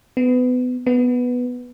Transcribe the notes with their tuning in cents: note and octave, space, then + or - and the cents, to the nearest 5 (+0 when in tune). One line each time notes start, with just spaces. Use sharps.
B3 +25
B3 +0